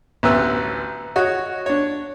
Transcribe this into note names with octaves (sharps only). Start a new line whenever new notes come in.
A1 D2 B3 B4 E6
F#4 C#5 D#5
D4 C#5